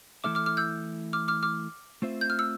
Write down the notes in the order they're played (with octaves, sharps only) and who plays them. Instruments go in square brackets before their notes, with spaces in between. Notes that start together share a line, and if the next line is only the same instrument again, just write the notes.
[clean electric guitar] E3 A3 E4 A4 E5 [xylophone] D6 F6
[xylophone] D6 F6
D6 F6
E6 G6
D6 F6
D6 F6
D6 F6
[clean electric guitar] A3 C4 F4 C5 E5
[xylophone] G6
F6
E6